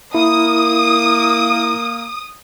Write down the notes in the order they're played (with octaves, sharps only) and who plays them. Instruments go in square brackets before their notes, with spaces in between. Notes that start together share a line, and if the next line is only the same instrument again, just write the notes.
[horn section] A#3 [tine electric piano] E4 [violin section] D#6